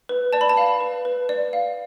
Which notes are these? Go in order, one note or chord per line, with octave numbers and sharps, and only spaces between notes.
B4
D5 A5
B5
A5
F5
B4
B4
D5
F5